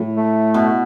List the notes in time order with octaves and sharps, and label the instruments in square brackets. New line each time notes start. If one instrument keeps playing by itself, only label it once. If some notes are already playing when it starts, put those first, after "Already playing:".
Already playing: [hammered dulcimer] A2
[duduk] A3
[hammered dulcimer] B2